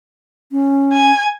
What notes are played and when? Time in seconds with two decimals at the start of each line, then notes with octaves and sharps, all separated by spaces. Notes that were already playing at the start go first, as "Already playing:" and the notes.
0.52 C#4
0.93 G#5